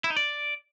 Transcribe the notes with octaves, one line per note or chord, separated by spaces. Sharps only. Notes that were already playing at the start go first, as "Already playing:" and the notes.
E4
D#4
D5